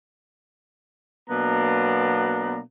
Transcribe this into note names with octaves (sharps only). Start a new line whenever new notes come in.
B2 F#3 A#3 B3 D4 A#5